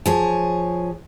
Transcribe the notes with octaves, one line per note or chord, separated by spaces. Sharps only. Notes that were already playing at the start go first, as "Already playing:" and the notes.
F3 G#4 C#5